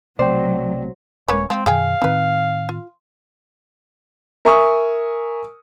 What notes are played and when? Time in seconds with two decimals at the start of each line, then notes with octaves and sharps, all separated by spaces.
0.19 B1 C3 F#3 A3 C5 D5 G5
1.28 D#1 G#3 A#3 C#4 B4 C#5
1.50 F3 G#3 C4
1.66 F#2 B2 D#3 G#4 F5 G5 G#5
2.02 A2 D#3 C4 D#4 B4
2.69 F4
4.45 A#4 E5 G#5 C#6 D#6